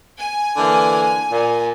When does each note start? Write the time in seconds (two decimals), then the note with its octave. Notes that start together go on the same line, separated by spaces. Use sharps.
0.19 G#5
0.57 D3 E3 A#3
1.31 A#2